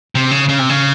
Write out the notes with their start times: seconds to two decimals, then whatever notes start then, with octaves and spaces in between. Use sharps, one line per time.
0.15 C3
0.31 C#3
0.49 C#3
0.59 C3
0.69 C#3